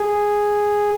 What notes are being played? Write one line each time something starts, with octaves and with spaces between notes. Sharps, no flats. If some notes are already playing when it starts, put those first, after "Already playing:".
Already playing: G#4